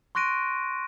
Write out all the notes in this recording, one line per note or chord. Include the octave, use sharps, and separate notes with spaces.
C6 C#6 F#6 A#6 D7 D#7